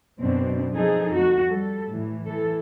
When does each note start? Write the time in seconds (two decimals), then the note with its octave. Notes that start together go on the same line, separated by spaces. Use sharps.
0.19 F#2 B2 C4 D4
0.75 F3 D#4 G#4 A4
1.13 F2 F#4
1.46 G3 A4
1.94 A2 E3
2.29 E3 A4